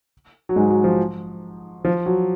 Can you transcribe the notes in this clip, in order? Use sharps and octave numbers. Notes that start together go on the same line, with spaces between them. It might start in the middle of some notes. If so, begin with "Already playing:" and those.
F#3
G#2 G#3
F#3
F3
F3
F#3